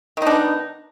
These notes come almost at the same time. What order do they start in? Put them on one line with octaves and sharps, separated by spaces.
D#3 D#4 D4 B3